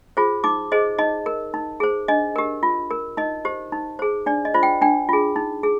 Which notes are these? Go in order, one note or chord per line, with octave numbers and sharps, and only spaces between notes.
F4 G#4 C5
D#4 D6
G#4 C5 D#5
D#4 D#5
A#4
D#4
G#4 C5
D4 D#5
G4 A#4
F4
A#4
D#4 D#5
G4 C5
D#4
G#4 C5
D4 D5
D#5
F4 C5
G5
D4 G5
F4 G#4
D#4
G#4